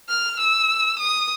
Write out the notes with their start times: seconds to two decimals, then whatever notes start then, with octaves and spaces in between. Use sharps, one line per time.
0.09 F6
0.39 E6
0.99 D#6